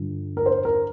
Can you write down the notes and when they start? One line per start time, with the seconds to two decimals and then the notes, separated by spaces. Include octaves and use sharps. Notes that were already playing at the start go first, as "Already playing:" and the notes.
Already playing: G2 D3 F3
0.37 A#4
0.46 C5
0.65 A#4